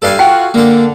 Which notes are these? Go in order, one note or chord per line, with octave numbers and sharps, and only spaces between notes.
G2 A4 F5 G#5
F4 F#4 G5
D3 A#3 A4